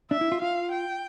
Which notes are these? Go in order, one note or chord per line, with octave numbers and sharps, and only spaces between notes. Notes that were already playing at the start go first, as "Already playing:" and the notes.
D4 E5
E4
F4
F4 F5
G5